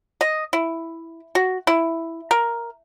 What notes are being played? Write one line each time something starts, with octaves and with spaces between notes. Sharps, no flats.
D#5
E4
F#4
E4
A#4